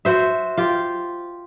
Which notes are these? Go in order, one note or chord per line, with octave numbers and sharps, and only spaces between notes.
F#4 C5 E5
F4 G4